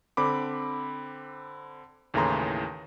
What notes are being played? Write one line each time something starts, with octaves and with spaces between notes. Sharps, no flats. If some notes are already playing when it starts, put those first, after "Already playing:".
D3 C4 B5 D6
D#2 A2 C#3 E3 A#5 C6